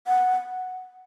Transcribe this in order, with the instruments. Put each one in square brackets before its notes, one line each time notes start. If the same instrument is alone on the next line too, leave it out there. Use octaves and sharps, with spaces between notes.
[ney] F#5